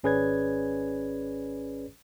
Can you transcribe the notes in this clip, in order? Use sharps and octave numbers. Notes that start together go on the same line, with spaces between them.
G#1 C#4 G#4 B4 D5 G#6